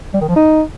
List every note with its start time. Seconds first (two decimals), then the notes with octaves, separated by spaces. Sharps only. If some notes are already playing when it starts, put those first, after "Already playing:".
0.14 G3
0.21 D#3
0.29 F3
0.36 D#4